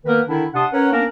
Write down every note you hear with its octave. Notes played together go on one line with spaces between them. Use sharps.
D#3 A#3 B3 A#4 B4
D3 D#3 D4 E4
C3 D4 F#5 A5 C6 D#6
C#4 A#4 B4 C#5 F#5
A#3 B3 C#4 D4 A#4